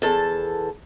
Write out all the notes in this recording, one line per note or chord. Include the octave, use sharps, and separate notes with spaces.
E2 A4 A5